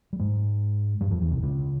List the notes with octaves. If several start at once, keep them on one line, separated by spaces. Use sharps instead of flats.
G3
G#2 G#3
G2 G3
F2 F3
E2 E3
C2 C3
C#2 C#3